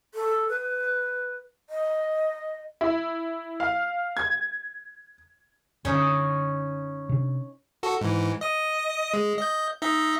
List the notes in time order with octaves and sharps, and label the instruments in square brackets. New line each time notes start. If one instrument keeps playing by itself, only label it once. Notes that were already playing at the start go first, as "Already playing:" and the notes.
[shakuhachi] A4
B4
D#5
[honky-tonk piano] E4
F5
G#6
[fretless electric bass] F#2 D3 [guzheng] C#4 D#4
[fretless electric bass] C3 D4
[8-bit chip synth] F#4 A4
G#2 E3
D#5 D#6
G#3
D#5 G6
D#4 D#5 E5